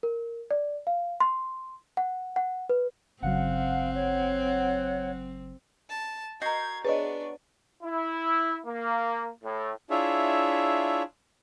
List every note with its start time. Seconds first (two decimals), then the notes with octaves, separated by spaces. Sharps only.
0.03 A#4
0.51 D5
0.87 F5
1.20 C6
1.97 F#5
2.36 F#5
2.69 B4
3.23 G1 C#3 F#3 C4 F5 F#5
3.95 C#5
5.89 A5
6.42 F#4 A#4 D#5 G6 G#6 C7
6.85 B3 D4 G#4 B4 C#5 D#5 C#6
7.84 E4
8.66 A#3
9.43 A2
9.90 D4 E4 F4 G#4 C#5 E5